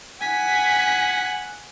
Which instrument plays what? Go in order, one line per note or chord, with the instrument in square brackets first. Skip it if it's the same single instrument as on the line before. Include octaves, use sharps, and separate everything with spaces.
[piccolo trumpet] F#5 [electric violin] G#5 B6